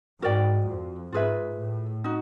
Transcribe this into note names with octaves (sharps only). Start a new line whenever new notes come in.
G#2 F#4 A#4 D5 G5
F2
G#2 F4 G#4 B4 E5
A2
D#4 F#4